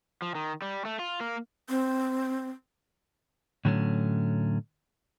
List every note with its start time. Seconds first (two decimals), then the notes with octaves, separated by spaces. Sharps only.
0.22 F3
0.35 D#3
0.62 G3
0.85 A3
0.99 F4
1.20 A#3
1.69 C4
3.65 A2 D3 F#3 A3 C#4